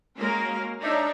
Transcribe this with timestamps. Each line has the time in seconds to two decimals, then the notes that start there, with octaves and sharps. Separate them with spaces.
0.17 G#3 A#3 C#4 F#4 A#4 F5
0.81 D4 D#4 G#4 C#5 E5